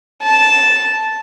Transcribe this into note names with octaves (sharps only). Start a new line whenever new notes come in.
A5